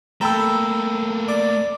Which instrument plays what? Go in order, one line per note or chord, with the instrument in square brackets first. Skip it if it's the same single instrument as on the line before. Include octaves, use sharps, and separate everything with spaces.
[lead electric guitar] A3 A#3 [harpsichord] A4 G5 [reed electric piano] A#5 B5 E6
[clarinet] D5 [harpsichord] D6